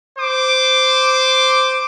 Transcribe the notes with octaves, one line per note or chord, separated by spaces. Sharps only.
C5 D6